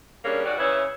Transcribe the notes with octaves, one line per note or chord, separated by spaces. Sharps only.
G3 A#3 C#4 D4 G#4
G#2 G3 F#4 D5 F#5
C#3 E3 E4 C#5